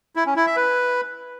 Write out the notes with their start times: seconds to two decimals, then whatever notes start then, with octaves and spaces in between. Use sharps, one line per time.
0.16 E4
0.26 C#4
0.36 E4
0.46 E5
0.56 B4